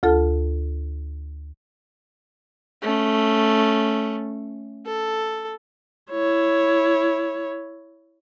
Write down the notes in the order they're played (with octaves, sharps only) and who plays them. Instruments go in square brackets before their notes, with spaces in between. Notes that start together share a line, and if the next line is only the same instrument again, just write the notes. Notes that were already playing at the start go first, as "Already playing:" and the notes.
[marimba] D2 F4 A4 A5
[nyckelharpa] A3 C#4
A4
[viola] E4 C#5